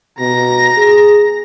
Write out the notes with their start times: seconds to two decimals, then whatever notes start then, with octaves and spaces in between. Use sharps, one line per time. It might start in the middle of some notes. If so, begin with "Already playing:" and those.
0.19 B2 A#5 A#6
0.77 G#4